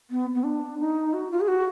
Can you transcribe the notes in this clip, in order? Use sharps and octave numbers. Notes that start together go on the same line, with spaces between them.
B3
B3
D4
D#4
F#4
F4
G#4
F#4